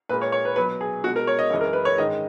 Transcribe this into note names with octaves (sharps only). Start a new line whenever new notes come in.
A#2 G#3 B4
C#5
C#5
B4
B2 F#3 B4
G#4
B2 G#3 F#4
A#4
C#5
D#5
F#2 E3 G#3
A#4
B4
C#5
G#2 D#3 G#3 D#5